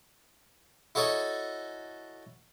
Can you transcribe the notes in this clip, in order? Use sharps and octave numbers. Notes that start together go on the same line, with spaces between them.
E4 F#4 A4 C#5 D#5